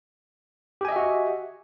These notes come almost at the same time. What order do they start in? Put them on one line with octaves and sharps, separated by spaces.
G4 G#5 D#5 E5 F#4